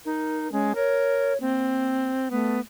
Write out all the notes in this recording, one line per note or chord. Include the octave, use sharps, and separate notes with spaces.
D#4 A#4
G#3 C#4
A#4 C#5
A#3 C4
A3 B3